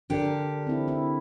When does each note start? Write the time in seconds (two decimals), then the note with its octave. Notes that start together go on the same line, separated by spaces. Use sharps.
0.10 D3 D4 G4 A#4 D5
0.67 C4 E4
0.88 E4